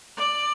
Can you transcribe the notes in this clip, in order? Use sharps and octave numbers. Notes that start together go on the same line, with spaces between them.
D5